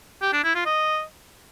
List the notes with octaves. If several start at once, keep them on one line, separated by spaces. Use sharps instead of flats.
G4
D4
E4
F4
D#5